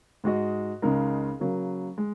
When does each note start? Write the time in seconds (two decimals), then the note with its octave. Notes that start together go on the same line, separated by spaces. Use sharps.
0.24 G#2 G#3 F#4 D#5
0.82 C#2 C#3 G#3 D#4 A#4
1.40 C#3 F#3 A#3
1.98 G#3